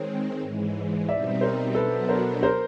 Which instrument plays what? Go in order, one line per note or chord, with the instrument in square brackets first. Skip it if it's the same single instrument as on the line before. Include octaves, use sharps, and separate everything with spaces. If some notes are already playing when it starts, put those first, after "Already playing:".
Already playing: [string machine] D#3 G#3 C4 [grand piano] C#5
[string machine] G#2 E3 G#3
[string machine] B2 G3 C4 D#4 [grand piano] D5 E5
[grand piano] A#4 C5
[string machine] B2 F#3 B3 D4 [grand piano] A4 B4
[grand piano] A#4 C5
A#4 C5